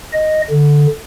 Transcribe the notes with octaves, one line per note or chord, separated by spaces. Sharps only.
D#5
D3